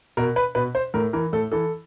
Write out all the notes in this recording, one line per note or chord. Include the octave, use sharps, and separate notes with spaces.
B2 A#4
B4
B2 B4
C5
A2 A#4
E3 A#4
A2 A4
E3 A4